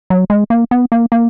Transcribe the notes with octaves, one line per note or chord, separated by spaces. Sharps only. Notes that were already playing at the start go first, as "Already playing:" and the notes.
F#3
G#3
A#3
B3
A#3
A#3